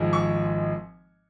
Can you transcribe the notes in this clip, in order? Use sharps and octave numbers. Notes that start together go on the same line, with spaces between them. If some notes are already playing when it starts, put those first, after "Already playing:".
Already playing: G#1 G#2 F3 G#3
C#6